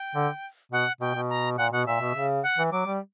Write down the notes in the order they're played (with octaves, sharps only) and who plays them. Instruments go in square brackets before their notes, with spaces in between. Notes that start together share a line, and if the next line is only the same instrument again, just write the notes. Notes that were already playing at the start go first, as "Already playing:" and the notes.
Already playing: [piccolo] G5
[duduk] D3
[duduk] B2 [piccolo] F#5
[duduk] B2 [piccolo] G5
[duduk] B2
[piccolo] A#5
[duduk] A#2 [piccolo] F#5
[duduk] B2 [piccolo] F#5
[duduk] A#2 [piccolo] E5
[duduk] B2
C#3
[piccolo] F#5
[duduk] E3
[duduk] F#3 [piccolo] D6
[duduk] G3